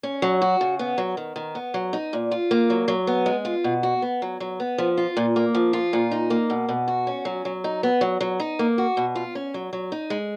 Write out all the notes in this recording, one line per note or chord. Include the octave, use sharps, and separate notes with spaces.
C#4
F#3
F#4
C#3
B3
F#3
D#3
D#3
B3
F#3
D#4
A#2
F4
A#3
F#3
F#3
B3
G#3
F4
B2
F#4
B3
F#3
F#3
B3
F3
F4
A#2
A#3
F3
F4
A#2
D#4
A#3
B2
B2
F#4
C#4
F#3
F#3
D#4
B3
F#3
F#3
D#4
A#3
F#4
B2
F4
C#4
F#3
F#3
D#4
G#3